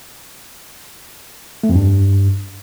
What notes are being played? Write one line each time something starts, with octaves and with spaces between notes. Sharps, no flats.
A3
F2
G2